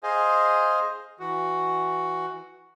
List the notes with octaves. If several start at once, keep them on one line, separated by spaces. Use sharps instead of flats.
G#4 C5 D#5 F5 G#5
E3 F#4